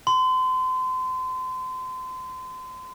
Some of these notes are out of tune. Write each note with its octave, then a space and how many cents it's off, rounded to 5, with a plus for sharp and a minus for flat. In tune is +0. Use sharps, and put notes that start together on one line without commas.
C6 -35